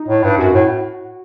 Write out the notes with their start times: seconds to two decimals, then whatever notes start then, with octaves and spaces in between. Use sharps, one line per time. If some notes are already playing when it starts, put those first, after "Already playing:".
Already playing: D#4
0.09 A2
0.24 G2
0.38 F#2 F#4
0.53 A2